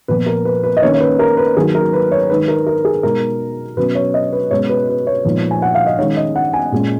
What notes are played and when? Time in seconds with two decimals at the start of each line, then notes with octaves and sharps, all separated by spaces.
0.08 A#2 F3 B3 B4
0.26 A#4
0.45 B4
0.64 B4
0.77 D#5
0.82 D#3 A#3 C#4 C#5
0.95 C#5
1.00 B4
1.19 A#4
1.37 B4
1.57 D#3 F#3 A#3 G#4
1.75 A#4
1.93 B4
2.12 C#5
2.29 D#3 G#3 D#4 B4
2.48 A#4
2.67 A#4
2.85 G#4
3.03 B2 G#3 D#4 A#4
3.77 B2 F#3 C#4 B4
3.95 C#5
4.14 D#5
4.33 B4
4.51 B2 G#3 C#4 C#5
4.69 B4
4.88 B4
5.07 C#5
5.25 A#2 F3 G#3 B3 D#4
5.51 G#5
5.62 F#5
5.75 F5
5.86 D#5
5.99 D#3 G#3 C#4 C#5
6.17 D#5
6.36 F#5
6.54 G#5
6.72 A#2 G#3 C#4